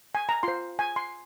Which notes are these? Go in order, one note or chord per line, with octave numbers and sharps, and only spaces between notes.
G#5
A#5
F4 C5 C6
G#5
C6